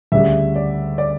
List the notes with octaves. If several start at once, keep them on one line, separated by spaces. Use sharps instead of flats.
D2 C#3 G3 E5
D5
D5